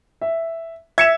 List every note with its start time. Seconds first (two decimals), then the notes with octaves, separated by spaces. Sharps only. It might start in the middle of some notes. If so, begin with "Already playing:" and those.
0.21 E5
0.98 E5 G#6 C#7 E7